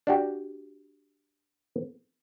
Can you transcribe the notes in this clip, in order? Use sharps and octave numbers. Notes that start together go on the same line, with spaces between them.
D4 F#4 G4